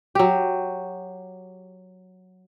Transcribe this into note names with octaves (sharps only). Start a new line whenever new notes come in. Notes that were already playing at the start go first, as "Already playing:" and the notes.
F#3 G4